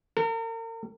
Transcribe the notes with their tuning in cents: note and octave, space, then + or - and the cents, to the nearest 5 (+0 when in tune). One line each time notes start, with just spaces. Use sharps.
A#4 -40